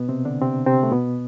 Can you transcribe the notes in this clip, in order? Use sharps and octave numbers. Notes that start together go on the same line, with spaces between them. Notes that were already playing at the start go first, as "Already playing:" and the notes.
Already playing: B2 B3
C3 C4
D3 D4
C3 C4
C3 C4
A3
B2 B3